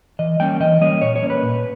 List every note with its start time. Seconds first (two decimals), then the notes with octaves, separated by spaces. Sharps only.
0.19 E3 D#5
0.40 G3 A#3 C#4 G5
0.60 E3 D#5
0.81 G3 A#3 C#4 D#5
1.01 A#2 C#5
1.16 C#5
1.23 A#3 C#4
1.30 B4
1.43 A#2